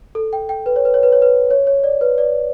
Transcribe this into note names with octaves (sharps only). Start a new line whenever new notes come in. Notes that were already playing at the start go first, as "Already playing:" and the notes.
A4
G5
G5
B4
C#5
B4
C#5
B4
C#5
B4
C#5
C#5
D5
B4
D5